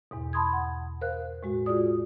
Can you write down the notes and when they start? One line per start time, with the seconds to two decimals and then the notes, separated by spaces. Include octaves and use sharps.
0.11 E2 G#2 B2
0.33 A5 B5 C6 D#6 G#6
0.53 F#5
1.01 A#4 C5 F5 F#6
1.43 A2 G#3 F#4
1.66 F4 F#4 G#4 D5 D#6